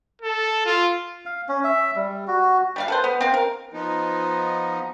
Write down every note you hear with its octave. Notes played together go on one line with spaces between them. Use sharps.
A4
F4
F5
C#4
E5
G3
F#4
G3 A3 F5
A4 B4 C5
B3
C4 F5
A#4
F3 B3 D#4